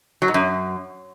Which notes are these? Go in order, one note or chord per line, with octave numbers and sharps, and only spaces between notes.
F#3
G#2
F#2